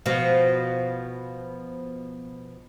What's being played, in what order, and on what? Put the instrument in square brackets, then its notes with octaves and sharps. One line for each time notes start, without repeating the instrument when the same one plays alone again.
[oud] B2 F3